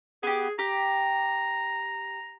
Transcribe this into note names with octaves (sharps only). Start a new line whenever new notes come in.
B3 G4 G#4
G4 A#5